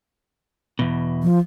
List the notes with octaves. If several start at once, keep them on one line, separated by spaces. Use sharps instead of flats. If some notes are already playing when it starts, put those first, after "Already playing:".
E2 B2
F3